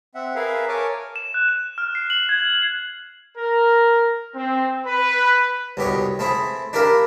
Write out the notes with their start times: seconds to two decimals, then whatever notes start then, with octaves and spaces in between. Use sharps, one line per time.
0.15 C4 E5 F#5
0.36 G#4 A#4 B4 E5 F5
0.68 A#4 C#5 G#5 A5 D6
1.16 E7
1.34 F#6
1.49 E7
1.78 F6
1.95 C7
2.10 F#7
2.29 G#6
3.36 A#4
4.35 C4
4.86 B4
5.77 C2 B2 G4 C#5
6.19 A3 C4 E4 G#4
6.73 D4 E4 G4 A#4 F5